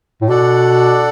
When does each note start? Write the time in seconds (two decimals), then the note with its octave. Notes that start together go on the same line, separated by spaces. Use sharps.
0.22 A2
0.29 B2 D4 A4 D5 F#5